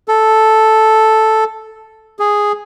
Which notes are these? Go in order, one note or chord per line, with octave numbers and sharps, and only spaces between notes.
A4
G#4